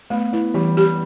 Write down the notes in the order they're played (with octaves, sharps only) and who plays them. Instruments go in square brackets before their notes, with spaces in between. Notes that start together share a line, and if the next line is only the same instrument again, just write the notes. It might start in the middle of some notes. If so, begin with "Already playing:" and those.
[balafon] A3 [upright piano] B3
[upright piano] B3 [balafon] E4
[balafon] E3 [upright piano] G3
[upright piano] G3 [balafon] G4